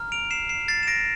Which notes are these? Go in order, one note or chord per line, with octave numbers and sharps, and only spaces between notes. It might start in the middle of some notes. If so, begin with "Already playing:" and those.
Already playing: A#5 F6
D7 F7
C7 E7
C7 E7
A6 C7
E7
A#6 D7